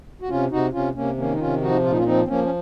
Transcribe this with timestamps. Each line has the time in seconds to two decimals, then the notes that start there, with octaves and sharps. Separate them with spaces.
0.22 F#4
0.29 C3 C#4 F4
0.51 C3 D#4 F#4
0.73 C3 C#4 F4
0.95 C3 A#3 C#4
1.17 D#3 A#3 C#4
1.34 D#4
1.39 C3 C#4 F4
1.61 F3 D#4 F#4
1.84 A#2 F4
1.90 D#4
1.97 C#4 F4
2.05 F3 C4 D#4
2.24 C4
2.28 F3 A#3 C#4
2.44 C#4